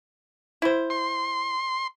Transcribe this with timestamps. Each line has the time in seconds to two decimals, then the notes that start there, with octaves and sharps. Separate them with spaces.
0.62 E4 C5
0.90 C6